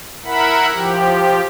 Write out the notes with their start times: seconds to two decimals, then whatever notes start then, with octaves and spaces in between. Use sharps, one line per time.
0.25 E4 A#4 E5 F#5 B5
0.73 F3 G4